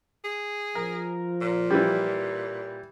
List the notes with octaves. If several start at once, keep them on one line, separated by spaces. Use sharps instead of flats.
G#4
F3 A#4
A#2
E3 G3